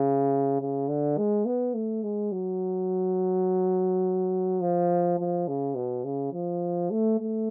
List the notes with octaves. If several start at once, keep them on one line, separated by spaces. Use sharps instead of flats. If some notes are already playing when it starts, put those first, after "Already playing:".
Already playing: C#3
C#3
D3
G#3
B3
A3
G#3
F#3
F3
F3
C#3
B2
C#3
F3
A3
A3